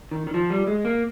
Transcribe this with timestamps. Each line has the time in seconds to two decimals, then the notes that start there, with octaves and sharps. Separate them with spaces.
0.11 D#3
0.27 D#3
0.34 F3
0.50 G3
0.67 G#3
0.85 A#3